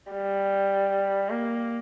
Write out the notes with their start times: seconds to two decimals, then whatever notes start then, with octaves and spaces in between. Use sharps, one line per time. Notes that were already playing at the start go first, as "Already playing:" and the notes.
0.12 G3
1.29 A#3